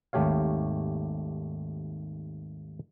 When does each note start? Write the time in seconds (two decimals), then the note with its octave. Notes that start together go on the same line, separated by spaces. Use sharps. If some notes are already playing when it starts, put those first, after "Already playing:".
0.13 G#1 D#2 A3 G4 C#5 F5